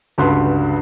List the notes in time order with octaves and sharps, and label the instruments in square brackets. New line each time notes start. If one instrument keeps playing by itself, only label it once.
[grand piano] C#2 G2 D3 F#4 B4 C6